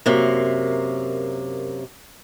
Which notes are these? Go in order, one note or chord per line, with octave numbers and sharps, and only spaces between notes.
F#2 C3 A#3